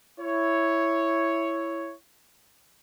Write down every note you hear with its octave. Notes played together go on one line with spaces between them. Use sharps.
E4 C#5